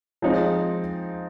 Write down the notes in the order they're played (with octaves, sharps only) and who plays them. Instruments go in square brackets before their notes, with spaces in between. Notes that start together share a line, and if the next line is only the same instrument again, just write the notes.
[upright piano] F3 G#3 C4 D#4